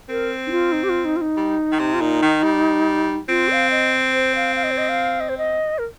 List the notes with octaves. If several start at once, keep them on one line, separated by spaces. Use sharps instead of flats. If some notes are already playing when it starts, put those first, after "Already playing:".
C4 A#4
D#4
F4
D#4
G4
F4
D#4
F4
D#4
G3
D#3
C3
F4
A#2 D#4
D#3
G3
C4 F4
F5
D#5
C5
F5
F5
D#5
C5
D#5
F5
D#5
C5
D#5
A#4